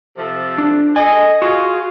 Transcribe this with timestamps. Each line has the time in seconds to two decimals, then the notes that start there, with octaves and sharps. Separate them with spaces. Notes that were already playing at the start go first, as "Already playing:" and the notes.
0.18 C3 F3 A4
0.58 D4
0.96 A4 D#5 G#5
1.42 F4 F#4 G#4